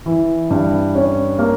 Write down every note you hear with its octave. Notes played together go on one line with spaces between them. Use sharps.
E3
G2
C#4
A#3